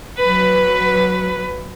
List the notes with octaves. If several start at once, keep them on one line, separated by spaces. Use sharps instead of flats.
F#3 B4